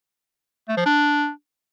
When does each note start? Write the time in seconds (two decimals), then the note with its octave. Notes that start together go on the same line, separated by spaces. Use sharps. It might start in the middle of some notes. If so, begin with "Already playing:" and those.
0.69 A3
0.77 F3
0.86 D4